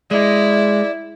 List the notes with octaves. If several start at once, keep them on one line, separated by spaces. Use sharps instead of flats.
G#3 E4 D5